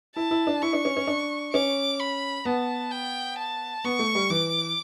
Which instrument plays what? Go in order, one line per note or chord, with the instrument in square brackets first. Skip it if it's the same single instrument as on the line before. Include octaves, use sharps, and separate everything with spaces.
[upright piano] E4 [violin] A5
[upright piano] E4
D4
[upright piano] E4 [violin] C#6
[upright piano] D4
C#4
C#4
D4
[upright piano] C#4 [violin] D6
[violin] B5
[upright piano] B3 [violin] A5
[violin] G5
A5
[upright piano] B3 [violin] C#6
[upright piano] A3
G3
[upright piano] E3 [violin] D6